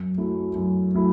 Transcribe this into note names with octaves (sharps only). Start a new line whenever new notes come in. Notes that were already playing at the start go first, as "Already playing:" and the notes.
Already playing: F#2
F#3 A3 E4
F#2
F#3 A3 E4